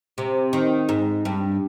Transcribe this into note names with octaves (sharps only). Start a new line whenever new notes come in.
C3
D#3
G#2
G2